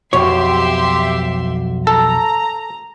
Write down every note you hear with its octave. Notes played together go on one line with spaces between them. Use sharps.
B1 F2 G4 C#5 E5 C6
A4 A#5